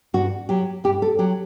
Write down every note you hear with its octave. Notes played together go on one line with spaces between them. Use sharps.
G2 F#4
F#3 G4
G2 G4
A4
F#3 G4